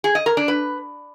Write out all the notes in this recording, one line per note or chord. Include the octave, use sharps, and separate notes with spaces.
G#4
D#5
A#4
D4
B4